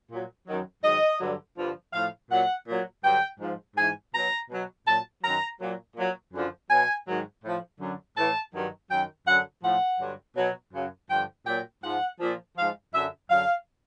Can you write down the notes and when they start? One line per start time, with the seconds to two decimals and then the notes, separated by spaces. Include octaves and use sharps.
0.10 A#2 F#3
0.47 F#2 D#3 F#3
0.83 G#2 D#3 F#3 D#5
1.20 G2 D3 F#3
1.57 G2 D3 F3
1.93 A2 F3 F5
2.30 A#2 F#3 F#5
2.67 A#2 F#3
3.03 G2 D3 F#3 G5
3.39 G#2 F3
3.76 G#2 E3 G#5
4.13 B2 F#3 A#5
4.50 B2 F#3
4.86 A#2 F#3 A5
5.23 F#2 D#3 F#3 A#5
5.60 A#2 F#3
5.96 A#2 F#3
6.33 F#2 D3 F3
6.69 B2 F#3 G#5
7.06 G#2 D#3 F#3
7.43 A2 F3
7.80 F#2 D3 F#3
8.16 A2 E3 A5
8.53 G2 D#3 F#3
8.90 F#2 D#3 F#3 G5
9.26 F#2 D3 F#3 F#5
9.63 A2 F3 F#5
9.99 G2 D3 F#3
10.36 B2 F#3
10.73 F#2 C#3 F#3
11.09 G2 D3 F3 G5
11.46 A#2 F#3 G5
11.83 G#2 F3 F#5
12.20 A#2 F3
12.56 G#2 F3 F5
12.93 F#2 D3 F#3 E5
13.29 F#2 D3 F#3 F5